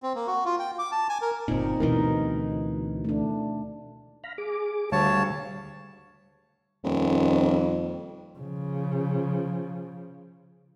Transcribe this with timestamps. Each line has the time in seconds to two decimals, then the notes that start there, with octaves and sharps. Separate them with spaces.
0.03 C4
0.15 A#3
0.27 F#4
0.45 F4
0.59 G5
0.79 D6
0.92 A5
1.09 G#5
1.22 A#4
1.48 G1 A#2 C4 D#4
1.80 D2 B2 E3 D#4 A#4
3.04 A3 D4
4.24 F5 A#5 B5
4.38 G#4 D6
4.92 D2 D3 G3 C#5 F5 A5
6.85 D#1 F2
8.39 C#3 F3